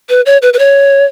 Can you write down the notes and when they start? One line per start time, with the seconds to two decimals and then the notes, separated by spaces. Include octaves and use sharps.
0.09 B4
0.26 C#5
0.42 B4
0.53 B4
0.59 C#5